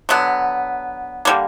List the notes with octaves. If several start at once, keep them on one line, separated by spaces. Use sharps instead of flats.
D3 F#3 B3
D3 G3 A#3